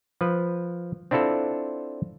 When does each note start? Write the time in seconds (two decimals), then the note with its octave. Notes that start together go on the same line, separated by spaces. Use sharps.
0.21 F3 B4
1.11 C4 D4 E4 F4 A4